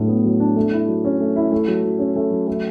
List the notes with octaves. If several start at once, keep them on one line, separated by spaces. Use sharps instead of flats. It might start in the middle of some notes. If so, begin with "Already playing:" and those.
Already playing: A2 F#3 D4
B3
F#3
D4
A3
E4
F#3
C#4
A3
E4
A3
F#3
F#3
C#4
A3
F#3
A3